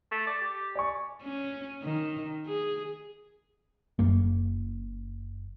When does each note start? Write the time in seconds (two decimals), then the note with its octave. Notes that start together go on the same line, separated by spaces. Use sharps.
0.11 A3
0.27 D5
0.41 G4
0.75 D5 G#5 C#6
1.23 C#4
1.83 D#3
2.47 G#4
3.99 F#1 F#2 A#3